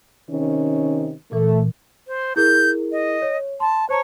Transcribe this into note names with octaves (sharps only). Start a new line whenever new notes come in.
C3 D#3 C#4
A#2 E3 A3
C5
E4 G#4 A#4 G6
D#5
C#5
A5 C6
C5 C#5 A5 A#5